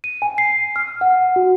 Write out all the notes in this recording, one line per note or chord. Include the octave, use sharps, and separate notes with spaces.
D#7
G#5
C7
F6
F#5
F#4